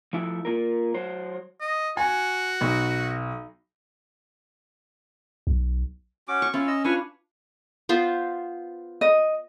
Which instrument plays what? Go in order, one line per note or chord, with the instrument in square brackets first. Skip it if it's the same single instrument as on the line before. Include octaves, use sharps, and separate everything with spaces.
[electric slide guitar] F3 A3 E4 E5
A#3 F4 A#4
F#3 C5
[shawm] D#5
[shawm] F#4 [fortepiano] G#5
[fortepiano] B1
[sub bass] B1
[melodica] C#4 F#4 D6
[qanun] C#6
[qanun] C#4 [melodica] E4 F4
[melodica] D#5 E6
[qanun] D4 F4 [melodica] B4 G#5 C#6
[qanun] B3 F4 C5
[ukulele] D#5